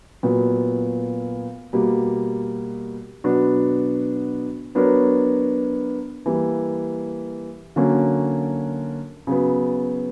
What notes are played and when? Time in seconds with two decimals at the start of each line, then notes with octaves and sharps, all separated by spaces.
0.23 A#2 F#3 B3
1.73 B2 G3 A#3
3.24 B2 F#3 B3 D4 F#4
4.75 F#3 B3 D4 A#4 C#5
6.26 E3 G3 A#3
7.76 D3 F#3 A#3 C#4
9.27 C#3 F#3 B3